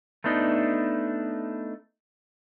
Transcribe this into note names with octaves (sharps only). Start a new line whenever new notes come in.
A3 B3 D4 D#4